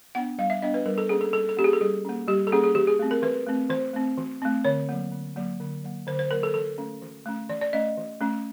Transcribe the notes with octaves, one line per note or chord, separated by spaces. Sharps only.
B3 D4 F#5
G3 F5
E5
B3 D4 D#5
B4
G3 A#4
A4
A#3 C#4 G#4
A4
G3 A4
A4
A#3 C#4 G4
G#4
A4
G3 G#4
A#3 C#4
G3 G4
A4
A#3 C#4 G#4
G#4
E3 G4
G#4
A3 C4
A#4
E3 B4
A3 C4
E3 C5
A3 C4
E3
A3 C4
D3 C#5
F#3 A#3
D3
F#3 A#3
D3
F#3 A#3
D3 C5
C5
F#3 A#3 A#4
A4
E3 A4
A3 C#4
E3
A3 C#4
E3 D5
D5
A3 C#4 D#5
E3
A3 C#4